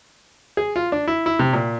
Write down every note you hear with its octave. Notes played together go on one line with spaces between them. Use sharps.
G#4
F4
D4
E4
E4
C3
A#2